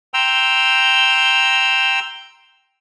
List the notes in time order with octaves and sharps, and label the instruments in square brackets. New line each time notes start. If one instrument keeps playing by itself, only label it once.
[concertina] G5 A#5 C6 E6